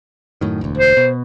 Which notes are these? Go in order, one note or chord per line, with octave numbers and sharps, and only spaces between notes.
F#2 A2 D#3
E1 D2
C5
B2